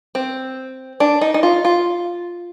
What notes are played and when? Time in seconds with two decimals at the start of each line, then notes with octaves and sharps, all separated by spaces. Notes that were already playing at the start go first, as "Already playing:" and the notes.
0.15 C4
1.00 D4
1.21 D#4
1.34 D#4
1.43 F4
1.65 F4